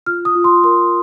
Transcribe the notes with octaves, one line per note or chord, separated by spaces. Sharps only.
F4 F6
D#6
F4
C6
A#4 C6